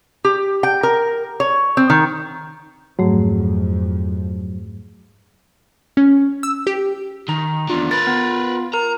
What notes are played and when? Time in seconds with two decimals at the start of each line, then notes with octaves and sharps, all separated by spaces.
0.25 G4
0.63 G5
0.83 A#4
1.40 C#5
1.77 C4
1.90 D#3
2.99 F2 G#2 F3 F#3 A3
5.97 C#4
6.43 E6
6.67 G4
7.29 D#3 A#5
7.69 E2 D3 F4
7.91 A#4 B4 A6
8.07 B3
8.74 A#4 A#5